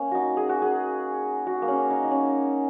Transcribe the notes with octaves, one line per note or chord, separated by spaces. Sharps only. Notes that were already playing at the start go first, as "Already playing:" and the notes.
Already playing: A#3 C#4
D#4 F#4
G#4
F#4
G#4
F#4
A#3
C#4
D#4
D#4
C#4